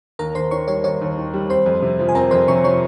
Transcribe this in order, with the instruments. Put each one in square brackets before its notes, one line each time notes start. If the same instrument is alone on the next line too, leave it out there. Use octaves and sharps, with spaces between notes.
[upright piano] D#2 [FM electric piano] A#4 A#5
[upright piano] D#2 [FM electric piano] C5 C6
[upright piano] D#3 [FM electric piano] C#5 C#6
[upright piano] G3 [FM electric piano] C#5 C#6
[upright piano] D#2 [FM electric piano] C#5 C#6
[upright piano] D#2
D#3
G3
[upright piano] C4 [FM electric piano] C5 C6
[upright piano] F2
C3
F3
[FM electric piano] G#5
[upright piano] C4 [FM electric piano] A#4 A#5
[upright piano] F2 [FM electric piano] C5 C6
[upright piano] C3 [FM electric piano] C#5 C#6
[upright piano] F3 [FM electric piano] C#5 C#6